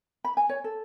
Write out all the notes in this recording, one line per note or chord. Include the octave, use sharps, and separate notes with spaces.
B5
G#5
C#5
A4